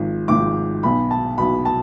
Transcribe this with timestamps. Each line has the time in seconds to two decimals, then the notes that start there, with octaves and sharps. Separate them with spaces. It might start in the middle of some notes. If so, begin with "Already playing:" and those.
Already playing: G#1 G#2 F3
0.28 G#1 G#2 F3 D6
0.83 B1 B2 B5
1.11 A5
1.38 B1 B2 B5
1.65 A5